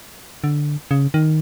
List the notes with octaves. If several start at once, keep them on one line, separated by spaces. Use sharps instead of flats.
D3
C#3
D#3